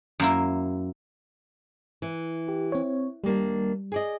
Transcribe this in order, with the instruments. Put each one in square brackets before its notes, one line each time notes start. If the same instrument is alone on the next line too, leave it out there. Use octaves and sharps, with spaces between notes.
[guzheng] F#2 A#3 E4
[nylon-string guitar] E3
[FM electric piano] G4
C4 C#5
[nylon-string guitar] D#2 A#3 D4 [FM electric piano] G3
[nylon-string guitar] G#4 D5 D#5